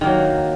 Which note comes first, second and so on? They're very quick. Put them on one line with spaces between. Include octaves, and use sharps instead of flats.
D#3 A#3 F#3